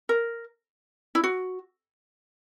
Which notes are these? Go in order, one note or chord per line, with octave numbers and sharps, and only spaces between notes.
A#4
E4
F#4